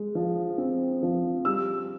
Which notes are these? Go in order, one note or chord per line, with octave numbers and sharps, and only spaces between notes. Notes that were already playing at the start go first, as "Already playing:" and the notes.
Already playing: G#3
F3
C4
F3
G3 E6